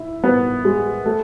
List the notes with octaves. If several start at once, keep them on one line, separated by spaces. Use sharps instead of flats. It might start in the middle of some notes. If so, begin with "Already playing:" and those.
Already playing: E4
B3
G#3
A3